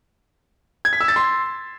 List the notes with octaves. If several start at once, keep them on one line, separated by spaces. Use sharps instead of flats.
G#6
B6
E6
A6
C6